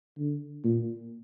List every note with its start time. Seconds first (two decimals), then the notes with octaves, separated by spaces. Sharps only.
0.19 D3
0.64 A#2